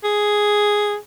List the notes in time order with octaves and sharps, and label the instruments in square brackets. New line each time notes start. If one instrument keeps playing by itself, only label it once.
[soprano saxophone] G#4